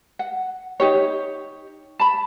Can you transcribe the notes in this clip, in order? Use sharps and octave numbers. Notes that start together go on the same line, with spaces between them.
F#5
D#4 G4 C#5
A5 B5